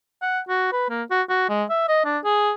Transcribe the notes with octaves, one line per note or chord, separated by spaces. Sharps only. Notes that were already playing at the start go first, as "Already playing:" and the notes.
F#5
F#4
B4
A#3
F#4
F#4
G#3
E5
D#5
D4
G#4